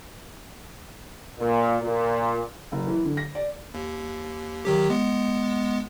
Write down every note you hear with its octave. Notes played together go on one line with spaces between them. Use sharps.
A#2
A#2
F#1
E3
D3
A#6
D5
D#2
D#3 F#3 G4
G#3 B3